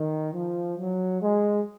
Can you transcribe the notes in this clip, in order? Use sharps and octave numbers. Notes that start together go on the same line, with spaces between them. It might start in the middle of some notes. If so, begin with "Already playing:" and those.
Already playing: D#3
F3
F#3
G#3